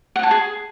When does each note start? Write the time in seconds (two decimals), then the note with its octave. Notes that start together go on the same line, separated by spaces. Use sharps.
0.16 F#5
0.23 A5
0.31 G#4